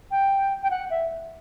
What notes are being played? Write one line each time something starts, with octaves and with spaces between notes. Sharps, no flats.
G5
G5
F#5
E5